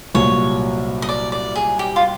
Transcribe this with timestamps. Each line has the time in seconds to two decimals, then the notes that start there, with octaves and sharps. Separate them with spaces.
0.15 C2 A#2 F#3 C#5
1.02 D#5
1.09 D5
1.32 D5
1.56 G#4
1.79 G4
1.96 F4